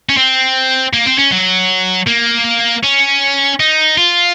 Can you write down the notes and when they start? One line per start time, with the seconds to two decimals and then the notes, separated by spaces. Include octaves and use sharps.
0.09 C#4
0.17 C4
0.93 A#3
1.06 C4
1.19 C#4
1.32 F#3
2.07 A#3
2.84 C#4
3.60 D#4
3.98 F4